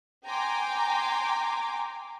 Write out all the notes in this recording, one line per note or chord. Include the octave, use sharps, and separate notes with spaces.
G5 G#5 A#5 C6 D6